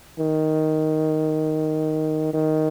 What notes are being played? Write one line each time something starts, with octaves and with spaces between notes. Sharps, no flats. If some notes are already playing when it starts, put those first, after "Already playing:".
D#3
D#3